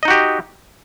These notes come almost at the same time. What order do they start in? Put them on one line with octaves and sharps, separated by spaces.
D#5 D#4 F#4 G4